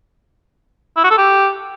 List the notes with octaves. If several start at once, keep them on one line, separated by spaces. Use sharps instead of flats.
E4
F#4
A4
G4